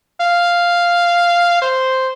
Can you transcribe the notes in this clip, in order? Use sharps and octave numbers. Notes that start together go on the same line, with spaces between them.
F5
C5